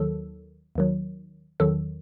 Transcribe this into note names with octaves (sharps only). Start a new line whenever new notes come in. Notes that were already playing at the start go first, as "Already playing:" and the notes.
Already playing: D#2 D#3 F#3 A4
D#2 D#3 F#3
E2 D#3 F#3 A4